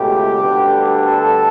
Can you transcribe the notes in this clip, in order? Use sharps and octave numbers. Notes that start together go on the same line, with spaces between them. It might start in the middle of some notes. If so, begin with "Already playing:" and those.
Already playing: C#2 B2 A3 G4
D2 D3 G3 B3
A4